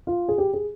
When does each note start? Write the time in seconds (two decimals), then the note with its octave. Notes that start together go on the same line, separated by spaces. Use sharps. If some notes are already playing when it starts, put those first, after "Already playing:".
0.07 F4
0.28 G#4
0.38 G4
0.53 G#4